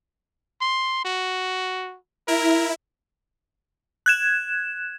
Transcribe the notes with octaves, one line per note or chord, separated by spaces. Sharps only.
C6
F#4
E4 A#4
F#6 G#6 E7